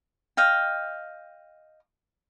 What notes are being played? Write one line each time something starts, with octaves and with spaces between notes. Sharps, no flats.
D#5 F5 G5